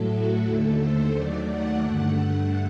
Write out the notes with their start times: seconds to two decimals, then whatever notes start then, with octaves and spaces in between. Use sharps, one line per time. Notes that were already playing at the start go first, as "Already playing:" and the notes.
Already playing: A2 F#3 A3 A4
0.08 F#4
0.42 D#2 D3 A3 A4
0.78 C5
1.12 D#2 D#3 F#3 A3 D5
1.47 F#5
1.82 G2 D3 A3